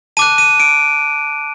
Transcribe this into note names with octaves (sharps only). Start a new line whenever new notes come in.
A5 D6 F#6 D#7
D#7
D7